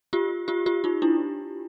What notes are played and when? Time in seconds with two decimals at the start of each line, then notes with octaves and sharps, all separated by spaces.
0.13 F4 G4
0.48 F4 G4
0.66 F4 G4
0.84 D#4 F4
1.02 D4 E4